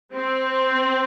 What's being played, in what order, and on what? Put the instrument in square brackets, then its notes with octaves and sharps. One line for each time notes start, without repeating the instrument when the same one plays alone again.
[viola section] C4